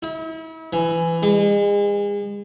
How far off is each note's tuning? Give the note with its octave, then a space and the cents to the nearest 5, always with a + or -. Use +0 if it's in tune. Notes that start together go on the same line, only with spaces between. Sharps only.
E4 -40
E3 +15
G#3 -35